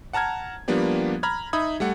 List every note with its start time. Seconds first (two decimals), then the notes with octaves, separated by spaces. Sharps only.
0.13 F#5 A5 A#5 F6 G#6
0.68 F3 G3 A#3 B3 D4 G4
1.23 A#5 B5 F6 G#6
1.53 D#4 E5 B5 D#6 G#6
1.80 G3 A3 F#5